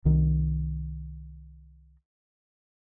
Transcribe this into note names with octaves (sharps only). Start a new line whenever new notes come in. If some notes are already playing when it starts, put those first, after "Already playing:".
C2 D#3